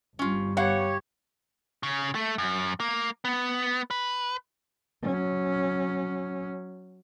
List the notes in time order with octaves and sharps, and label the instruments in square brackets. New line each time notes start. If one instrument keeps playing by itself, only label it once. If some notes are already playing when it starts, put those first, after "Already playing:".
[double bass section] G1 G3 [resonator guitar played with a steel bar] C#4 F4
[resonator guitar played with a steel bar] B3 F#5 [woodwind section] G4 C#5 [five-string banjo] F5
[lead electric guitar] C#3
A3
F#2
A#3
B3
B4
[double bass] F#3 C#4